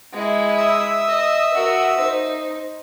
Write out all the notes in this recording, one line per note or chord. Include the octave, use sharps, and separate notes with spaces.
G#3 E4
E5 D#6 E6
D#5
F#4 A#4
D#4 C5